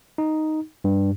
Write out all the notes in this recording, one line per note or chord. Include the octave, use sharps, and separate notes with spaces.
D#4
G2